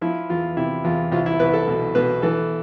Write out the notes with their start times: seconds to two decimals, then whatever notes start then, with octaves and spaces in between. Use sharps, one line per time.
0.01 F3 E4
0.30 E2 F4
0.57 C3 E4
0.84 E2 F4
1.12 C2 F4
1.26 E4
1.40 C2 B4
1.54 A4
1.67 B2
1.95 B2 B4
2.22 E3 A4